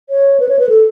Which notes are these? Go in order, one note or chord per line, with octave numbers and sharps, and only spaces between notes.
C#5
B4
C#5
B4
A4